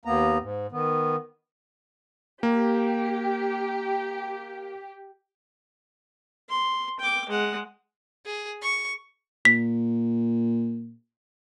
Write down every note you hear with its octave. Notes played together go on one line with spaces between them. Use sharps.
D#2 A#3 B3 A#5
G#2
D#3 B3
A#3 G4
C6
G5 D6
G#3 F#5
G#4
C#6
A#2 B6